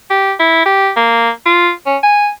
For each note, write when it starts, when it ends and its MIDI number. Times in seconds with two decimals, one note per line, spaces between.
0.10 0.33 67
0.40 0.63 64
0.66 0.90 67
0.96 1.30 58
1.46 1.71 65
1.86 1.97 61
2.03 2.29 80